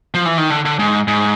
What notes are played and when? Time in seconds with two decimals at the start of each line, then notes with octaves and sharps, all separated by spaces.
0.14 F3
0.26 E3
0.38 D#3
0.50 D3
0.65 D3
0.79 G#2
1.08 G#2